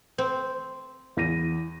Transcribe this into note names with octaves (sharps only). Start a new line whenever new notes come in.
C4
E2 A#6 D#7